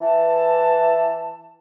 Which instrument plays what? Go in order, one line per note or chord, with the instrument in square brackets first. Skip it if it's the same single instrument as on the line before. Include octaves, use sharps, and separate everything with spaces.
[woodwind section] E3 A5